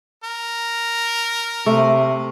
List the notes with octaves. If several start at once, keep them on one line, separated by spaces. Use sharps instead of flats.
A#4
C3 A3